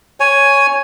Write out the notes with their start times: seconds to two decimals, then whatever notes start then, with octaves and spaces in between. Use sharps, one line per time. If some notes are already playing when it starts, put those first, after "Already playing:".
0.20 C#5 G#5